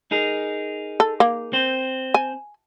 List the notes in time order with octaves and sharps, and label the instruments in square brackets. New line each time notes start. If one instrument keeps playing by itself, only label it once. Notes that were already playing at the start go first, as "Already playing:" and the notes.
[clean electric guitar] D#4 G#4 A#4
[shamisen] A4
A#3
[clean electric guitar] C4 C5
[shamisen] G#5